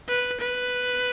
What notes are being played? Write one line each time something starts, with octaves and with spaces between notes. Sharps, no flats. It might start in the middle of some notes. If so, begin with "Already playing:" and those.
B4
B4